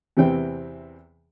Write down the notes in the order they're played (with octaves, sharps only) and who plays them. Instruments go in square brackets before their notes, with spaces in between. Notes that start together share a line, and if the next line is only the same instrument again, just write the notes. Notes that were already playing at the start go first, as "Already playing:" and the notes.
[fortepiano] E2 C3 E3 C4 G5